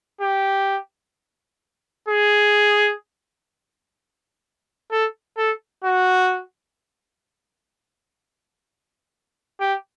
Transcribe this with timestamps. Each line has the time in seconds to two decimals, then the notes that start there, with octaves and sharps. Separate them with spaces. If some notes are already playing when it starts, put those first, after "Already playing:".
0.21 G4
2.08 G#4
4.91 A4
5.37 A4
5.84 F#4
9.60 G4